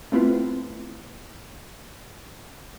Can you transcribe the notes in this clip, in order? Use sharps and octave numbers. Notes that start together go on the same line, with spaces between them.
A3 B3 C4 E4 F4 B4